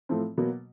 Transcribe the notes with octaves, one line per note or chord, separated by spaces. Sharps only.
A2 F3 A3 C4
B2 F#3 A#3